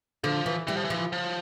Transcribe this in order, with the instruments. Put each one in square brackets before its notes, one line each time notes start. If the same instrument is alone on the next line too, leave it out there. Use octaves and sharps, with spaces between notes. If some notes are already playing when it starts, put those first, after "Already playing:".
[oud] D3 [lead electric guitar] F3
[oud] E3
[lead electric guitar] E3 [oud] G3
[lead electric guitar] F3
E3
[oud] F3
[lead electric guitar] F3